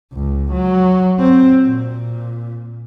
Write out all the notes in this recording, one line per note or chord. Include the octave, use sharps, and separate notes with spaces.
C#2
F#3
C4
A#2